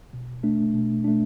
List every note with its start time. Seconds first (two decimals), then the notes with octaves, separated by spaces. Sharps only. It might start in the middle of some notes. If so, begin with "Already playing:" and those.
0.13 B2
0.43 A3 D4
0.74 B2
1.04 A3 D4